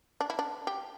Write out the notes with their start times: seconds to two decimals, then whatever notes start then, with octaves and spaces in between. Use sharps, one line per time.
0.21 D4
0.30 E4
0.39 D4
0.67 G4